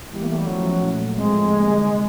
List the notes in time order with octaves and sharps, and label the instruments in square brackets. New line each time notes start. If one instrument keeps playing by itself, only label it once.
[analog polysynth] E3 G3 B3 E4 G4 [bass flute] G#3
[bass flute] A#3
A3
G3
[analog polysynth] F3 A3 C#4 E4 [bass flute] F#3
[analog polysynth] A#2 F#3 A3
[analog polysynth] A2 F3 A3 C4 F4 [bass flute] G#3
[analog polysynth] D3 G3 A#3 D#4
C3 F3